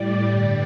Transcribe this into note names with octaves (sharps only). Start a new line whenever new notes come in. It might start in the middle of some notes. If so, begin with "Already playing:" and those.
Already playing: A2 G3 D5
G2 D3 G3 D5